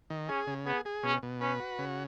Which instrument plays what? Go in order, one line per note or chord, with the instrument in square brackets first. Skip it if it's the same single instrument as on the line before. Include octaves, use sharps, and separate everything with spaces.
[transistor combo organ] D#3
[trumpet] C#4 [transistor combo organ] G#4
[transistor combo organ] C#3
[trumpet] B3 [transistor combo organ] G#4
[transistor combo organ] G#4
[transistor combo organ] B2 [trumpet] C#4
[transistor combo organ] B2
[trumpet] C#4 [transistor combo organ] B4
[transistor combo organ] F#4
C#3